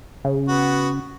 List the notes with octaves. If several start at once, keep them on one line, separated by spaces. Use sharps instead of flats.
C#3
B3 F#4